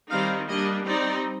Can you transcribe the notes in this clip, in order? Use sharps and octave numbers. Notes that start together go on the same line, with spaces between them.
D#3 G3 C4 D#4 F5
G3 A#3 D4 D#5
G3 C4 D#4 D5